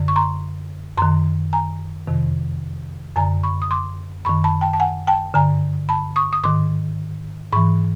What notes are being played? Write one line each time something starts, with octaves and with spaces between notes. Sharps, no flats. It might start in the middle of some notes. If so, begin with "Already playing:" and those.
Already playing: F#2 D3
C#6
A#5 C6
F#2 D#3 A#5 C6
G#5 A#5
F2 C3 D#3
F#2 D3 G#5 A#5
B5 C#6
D#6
C6 D6
F#2 D#3 B5 C#6
A5 B5
G5 A5
A5
F#5 G#5
G5 A5
G2 D3 G#5 A#5
A5 B5
C#6 D#6
D#6
G#2 D#3 C6 D6
G#2 E3 B5 C#6